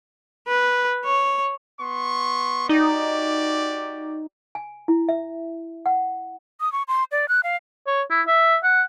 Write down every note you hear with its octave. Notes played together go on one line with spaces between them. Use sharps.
B4
C#5
B3 C6 C#6
D#4 F#4 G4 D5
G#5
E4
E5
F#5
D#6
C#6
C6
D5
F#6
F5
C#5
E4
E5
F#5